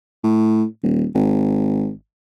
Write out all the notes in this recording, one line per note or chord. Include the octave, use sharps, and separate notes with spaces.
A2
D#1
G#1